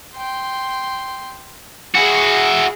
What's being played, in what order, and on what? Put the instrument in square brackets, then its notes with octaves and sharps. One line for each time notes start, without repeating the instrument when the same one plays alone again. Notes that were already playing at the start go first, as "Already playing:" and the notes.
[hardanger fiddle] G5 C6
[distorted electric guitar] E4 F#4 [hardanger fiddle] G#4